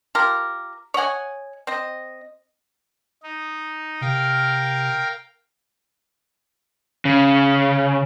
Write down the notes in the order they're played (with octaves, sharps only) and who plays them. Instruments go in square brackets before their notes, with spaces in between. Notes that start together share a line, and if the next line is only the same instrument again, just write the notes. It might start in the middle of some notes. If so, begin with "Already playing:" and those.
[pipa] F4 G4 A#4
C#5 D#5 F#5 G#5
C4 D#5
[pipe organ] D#4
[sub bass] C3 [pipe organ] A#4 F5 G5
[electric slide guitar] C#3